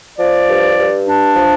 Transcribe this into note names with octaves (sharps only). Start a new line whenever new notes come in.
F3 D5
G2
G2
D4
F3